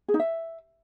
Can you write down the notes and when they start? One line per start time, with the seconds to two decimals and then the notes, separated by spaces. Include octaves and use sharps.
0.08 G#4
0.14 D#4
0.20 E5